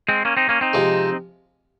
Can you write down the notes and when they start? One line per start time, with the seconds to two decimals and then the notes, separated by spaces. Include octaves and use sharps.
0.09 G#3 C4
0.25 A#3 C#4
0.37 C4 D#4
0.49 A#3 C#4
0.61 C4 D#4
0.73 C3 F3 G#3